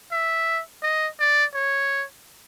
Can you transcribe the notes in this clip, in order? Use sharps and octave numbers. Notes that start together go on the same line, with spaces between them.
E5
D#5
D5
C#5